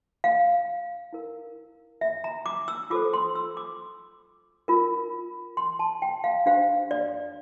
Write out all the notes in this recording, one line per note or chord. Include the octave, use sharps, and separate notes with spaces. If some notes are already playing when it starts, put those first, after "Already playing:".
F5
E4 A#4
E5
A#5
D6
E6
F4 A4 C5 D6
C6
E6
D6
F4 A#4
C6
A5
G5
F5
D4 G4 C5 F5
D5